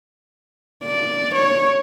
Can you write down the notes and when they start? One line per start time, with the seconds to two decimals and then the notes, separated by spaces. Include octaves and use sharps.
0.84 D5
1.35 C#5